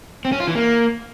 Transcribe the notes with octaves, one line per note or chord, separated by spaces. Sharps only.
C4
C#4
F4
E3
A#3